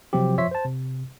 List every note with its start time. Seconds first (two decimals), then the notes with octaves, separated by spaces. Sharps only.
0.13 C3 F3 F#3 C4 G4
0.38 F3 C#5 E5 C6 B6
0.51 C5 A5
0.65 C3